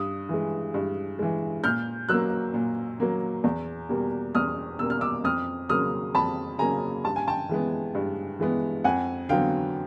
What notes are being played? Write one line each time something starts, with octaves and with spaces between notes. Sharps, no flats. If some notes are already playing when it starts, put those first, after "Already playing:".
Already playing: G2 D#6
E3 G#3
G2
E3 G#3
A#2 F6 G6
F#3 A#3 E6 F#6
A#2
F#3 A#3
E2
B2 G3 A#3
E2 D#6 F6
B2 G3 A#3 E6
F6
D6 E6
F2 D#6 F6
C#3 F#3 A#3 D#6 F6
F2 A5 B5
C#3 F#3 A#3 G#5 A#5
G2 A5
G#5
G5 A5
E3 G#3 B3
G2
E3 G#3 B3
F2 F#5 G#5
D3 F#3 B3 F5 G5